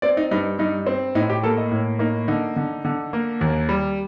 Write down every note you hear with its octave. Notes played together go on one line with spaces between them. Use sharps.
C4 D5
D#4
G2 D#4
G2 D#4
C4
A2 D#4
G4
A#3 A4
D#5
A2
A#3 D#4
D3 D#4
D3
D3
A#3
D#2
G3